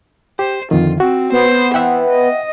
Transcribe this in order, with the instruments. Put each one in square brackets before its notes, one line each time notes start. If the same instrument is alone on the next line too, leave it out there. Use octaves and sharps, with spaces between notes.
[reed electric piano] G4 [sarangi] C5
[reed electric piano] F2 D3 D#3 [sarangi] F4
[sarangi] C4 [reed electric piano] F#4
[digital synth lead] B3 [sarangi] C5
[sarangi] E3 [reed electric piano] E5 F#5 G5
[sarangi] D#5